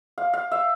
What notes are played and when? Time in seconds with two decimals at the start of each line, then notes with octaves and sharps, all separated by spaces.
0.18 F5
0.33 F5
0.51 E5